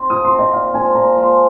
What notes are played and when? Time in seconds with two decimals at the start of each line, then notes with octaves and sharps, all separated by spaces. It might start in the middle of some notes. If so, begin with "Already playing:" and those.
Already playing: C4 D#4
0.10 F3 D#6
0.25 C6
0.31 C4 D#4
0.39 D#5
0.53 A#2 F5
0.74 F3 G#3 F4 G#5
0.95 A#2 A#5
1.16 F3 G#3 F4